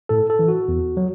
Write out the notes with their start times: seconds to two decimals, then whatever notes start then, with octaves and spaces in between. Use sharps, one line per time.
0.09 A2 A4
0.30 A4
0.39 E3
0.48 F#4
0.68 E2
0.97 F#3